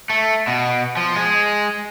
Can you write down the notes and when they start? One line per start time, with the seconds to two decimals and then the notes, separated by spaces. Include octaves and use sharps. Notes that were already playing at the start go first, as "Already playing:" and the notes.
0.10 A3
0.47 B2
0.97 F3
1.16 G#3